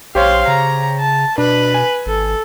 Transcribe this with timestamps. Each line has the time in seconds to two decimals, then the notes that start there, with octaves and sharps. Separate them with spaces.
0.15 A#1 G4 C5 C#5 F5 C6
0.48 C#3 A#5
1.00 A5
1.38 B2 D4 B4
1.74 G#5
2.06 G#1 A4